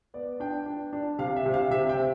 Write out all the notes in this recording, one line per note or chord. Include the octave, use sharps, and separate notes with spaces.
B3 D5
D4 G5
D4
D4
C3 F5
E5
C3
F5
C3 E5
G5
C4